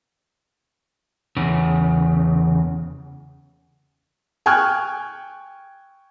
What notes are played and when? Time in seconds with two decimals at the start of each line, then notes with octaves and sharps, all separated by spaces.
1.37 E2 C#3
4.46 G5 G#5 C#6 F6 F#6 G#6